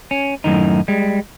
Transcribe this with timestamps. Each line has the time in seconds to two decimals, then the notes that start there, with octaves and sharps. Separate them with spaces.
0.11 C#4
0.44 F#2 A2 D#3 D#4
0.88 G3 G#3